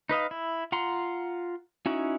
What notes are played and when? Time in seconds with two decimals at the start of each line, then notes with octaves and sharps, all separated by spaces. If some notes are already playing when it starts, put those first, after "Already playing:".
0.09 D#4 B4 D#5 F5
0.31 E4
0.72 F4 F#5 A#5 C6
1.86 C#4 D#4 E4 F#4